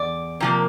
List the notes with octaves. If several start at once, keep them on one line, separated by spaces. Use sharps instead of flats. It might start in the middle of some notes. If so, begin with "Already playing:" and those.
Already playing: E2 D5
C3 F3 A#3